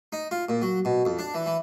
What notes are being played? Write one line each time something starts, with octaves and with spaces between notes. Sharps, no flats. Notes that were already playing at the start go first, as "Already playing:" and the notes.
D#4
F4
A#2
F#3
B2
F2
D4
E3
E3